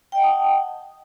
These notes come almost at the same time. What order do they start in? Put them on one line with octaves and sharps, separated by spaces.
G5 D#5 F#5 A5 D#6